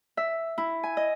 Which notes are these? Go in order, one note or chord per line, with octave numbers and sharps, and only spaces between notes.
E5
E4
G#5
D#5